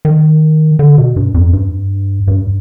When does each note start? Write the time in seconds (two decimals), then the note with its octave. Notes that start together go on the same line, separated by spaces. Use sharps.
0.05 D#3
0.79 D3
0.98 B2
1.16 G2
1.34 F2
1.53 G2
2.27 G2